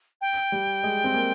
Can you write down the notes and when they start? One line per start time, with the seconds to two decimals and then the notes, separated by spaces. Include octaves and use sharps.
0.21 G5
0.52 G3
0.84 G#3
1.04 C4
1.14 A#3